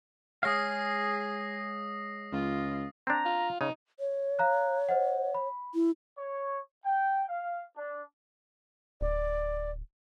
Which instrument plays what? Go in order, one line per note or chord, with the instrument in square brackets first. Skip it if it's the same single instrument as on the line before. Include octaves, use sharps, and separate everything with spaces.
[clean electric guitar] G#3 C#5 F5 [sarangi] G#4 [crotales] D#6 A#6 C7
[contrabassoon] C#2 [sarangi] F4
[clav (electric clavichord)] C4 D4 [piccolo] A#5
[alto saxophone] F4
[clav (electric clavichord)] C#3 [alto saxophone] D#4
[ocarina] C#5
[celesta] F5 A#5 F#6
C5 D#5 F#5
B5
[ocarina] E4
[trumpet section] C#5
G5
F5
D4
[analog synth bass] D1 [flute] D5